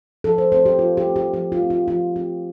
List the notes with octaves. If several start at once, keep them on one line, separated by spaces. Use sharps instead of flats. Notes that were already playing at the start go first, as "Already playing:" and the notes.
F3 A4
C5
A3 C4 C5
G4
F3 F4
G4
A3 C4
G4
F3 G4
F4
A3 C4
F4
F3 F4
A3 C4 G4